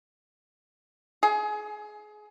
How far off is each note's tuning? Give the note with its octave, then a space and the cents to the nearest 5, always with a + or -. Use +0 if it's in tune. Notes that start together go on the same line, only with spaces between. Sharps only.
G#4 +25